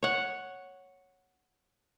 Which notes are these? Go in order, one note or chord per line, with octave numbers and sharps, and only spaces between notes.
C#5 F#5